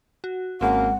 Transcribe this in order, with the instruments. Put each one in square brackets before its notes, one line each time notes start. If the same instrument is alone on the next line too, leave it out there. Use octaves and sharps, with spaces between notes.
[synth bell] F#4
[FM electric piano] G#1 [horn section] C#3 F#3 A#3 [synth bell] G#3 C4 [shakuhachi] F#5